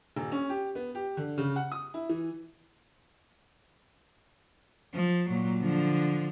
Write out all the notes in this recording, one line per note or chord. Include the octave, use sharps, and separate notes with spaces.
D#1
C#4
G4
B3
G4
D3
C#3
F#5
D#6
E4
E3
F3
A#2 F#3
D3 F3